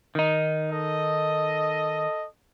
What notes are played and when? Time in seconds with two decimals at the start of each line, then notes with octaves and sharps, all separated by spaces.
0.15 D#3 D#4
0.72 A4 D#5